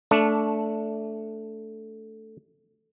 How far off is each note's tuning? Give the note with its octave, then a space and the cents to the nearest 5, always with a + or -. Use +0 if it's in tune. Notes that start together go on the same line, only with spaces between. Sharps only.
A3 +0 D4 -15